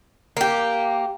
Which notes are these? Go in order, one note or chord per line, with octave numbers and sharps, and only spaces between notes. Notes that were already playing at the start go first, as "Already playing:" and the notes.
A#3 G4